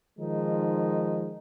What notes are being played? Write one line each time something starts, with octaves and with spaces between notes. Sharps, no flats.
D#3 F3 G#3 D#4